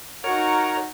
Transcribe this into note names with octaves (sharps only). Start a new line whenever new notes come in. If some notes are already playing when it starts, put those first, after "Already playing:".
D#4 F#4 A#4 C#5